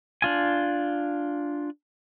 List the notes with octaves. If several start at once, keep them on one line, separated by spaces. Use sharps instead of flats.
D4 F4 G#5